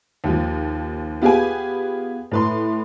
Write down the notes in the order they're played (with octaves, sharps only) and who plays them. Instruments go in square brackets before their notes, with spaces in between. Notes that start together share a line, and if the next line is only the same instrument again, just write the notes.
[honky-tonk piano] D#2 F3
B3 F4 G4 G#4 B4 G#5
A2 B4 C6